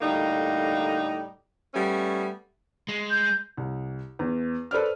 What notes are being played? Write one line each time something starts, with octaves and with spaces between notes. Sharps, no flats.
A2 D3 G3 A#3 D#4
G3 A3 B3 C#4
G#3
G6
C2
E2
A4 B4 C5 D5 F6